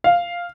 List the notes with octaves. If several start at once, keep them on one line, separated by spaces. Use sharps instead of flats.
F5